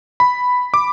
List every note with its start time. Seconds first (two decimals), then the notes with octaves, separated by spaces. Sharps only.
0.20 B5
0.74 D6